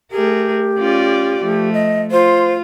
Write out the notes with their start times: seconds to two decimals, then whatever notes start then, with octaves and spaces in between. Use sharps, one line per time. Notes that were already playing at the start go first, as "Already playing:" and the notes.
0.12 A3 G4 G#4 A#4
0.78 C#4 F4 D5
1.42 F3 A3
1.73 D#5
2.12 F4 C5